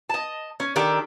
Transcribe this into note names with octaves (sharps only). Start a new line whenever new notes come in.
D#5 A5
C#4
D#3 D4 G4 A4